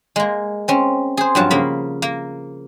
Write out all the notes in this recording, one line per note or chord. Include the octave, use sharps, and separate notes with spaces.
G#3 A#3
C4 C#4
G#4 C5
G2 F3 F#3 A5
C#3 A#3 F5 B5
A#3